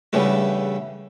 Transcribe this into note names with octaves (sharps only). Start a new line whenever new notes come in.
E2 G2 C#3 E3 G3 A3